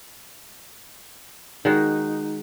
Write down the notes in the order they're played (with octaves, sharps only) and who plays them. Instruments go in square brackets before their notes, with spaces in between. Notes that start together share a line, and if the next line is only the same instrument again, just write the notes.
[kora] D#3 G#3 F#4 [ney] D#4